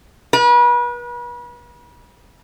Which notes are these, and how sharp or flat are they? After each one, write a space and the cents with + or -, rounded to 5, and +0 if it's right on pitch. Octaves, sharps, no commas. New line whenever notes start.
B4 -40